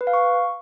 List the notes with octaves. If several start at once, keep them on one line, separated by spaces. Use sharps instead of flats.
B4
F5
C#6